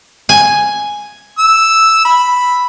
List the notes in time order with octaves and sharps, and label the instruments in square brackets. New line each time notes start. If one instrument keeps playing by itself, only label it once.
[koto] G#5
[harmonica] E6
B5